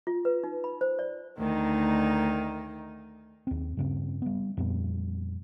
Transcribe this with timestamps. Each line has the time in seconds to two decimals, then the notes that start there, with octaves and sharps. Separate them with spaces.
0.07 F4
0.25 B4
0.44 D#4
0.64 B5
0.81 C5
0.99 D5
1.39 D2 D#3 D#4
3.47 D#2 C4
3.77 G2 C#3 C4
4.22 G3 B3
4.57 F2 A#2 G3 B3